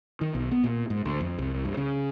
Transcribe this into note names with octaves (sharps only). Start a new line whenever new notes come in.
D#3
B1
B3
A#2
G#2
D2
F2
C2
G2
C#3